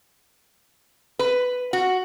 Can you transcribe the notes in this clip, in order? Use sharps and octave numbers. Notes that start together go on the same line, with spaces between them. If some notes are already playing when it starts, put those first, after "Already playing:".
B4
F#4